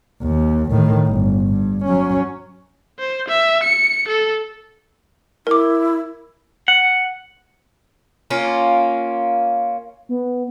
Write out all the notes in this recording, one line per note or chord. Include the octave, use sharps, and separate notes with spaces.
D#2
A2 D#3
G1
G2
F#3 C#4
C5
E5
C#7
A4
E4 A#4 D6
F#5
A#3 C#4 F4
B3